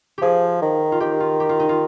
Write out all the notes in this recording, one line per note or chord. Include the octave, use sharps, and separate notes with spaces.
F3 G4 G#4
D#3
F4
D#3 G4
F4
G4
F4
D#4
F4